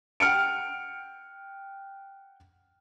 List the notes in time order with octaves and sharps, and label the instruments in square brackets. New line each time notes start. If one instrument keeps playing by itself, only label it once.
[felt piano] F#5 G5 F6 C#7 D7